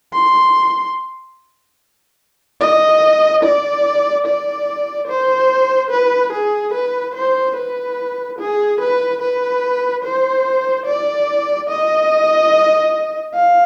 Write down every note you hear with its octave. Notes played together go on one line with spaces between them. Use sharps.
C6
D#5
D5
D5
C5
B4
G#4
B4
C5
B4
G#4
B4
B4
C5
D5
D#5
F5